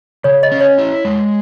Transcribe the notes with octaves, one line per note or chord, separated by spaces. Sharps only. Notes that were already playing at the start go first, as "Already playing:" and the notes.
C#3 C#5
D#5
C#4
C#5
E4
G#3